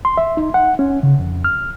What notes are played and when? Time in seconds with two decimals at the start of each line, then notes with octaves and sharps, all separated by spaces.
0.05 C6
0.17 E5
0.37 D#4
0.54 F#5
0.79 C#4
1.03 C#3
1.20 F2
1.45 F6